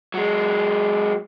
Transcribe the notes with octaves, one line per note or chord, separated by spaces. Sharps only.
F#3 G#3